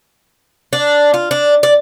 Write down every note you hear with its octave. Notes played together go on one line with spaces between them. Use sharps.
D4
F4
D4
D5